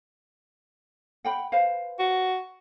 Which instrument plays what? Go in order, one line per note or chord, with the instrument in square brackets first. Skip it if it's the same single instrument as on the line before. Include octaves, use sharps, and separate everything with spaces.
[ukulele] F#5 G5 B5
B4 C5 F5
[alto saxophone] F#4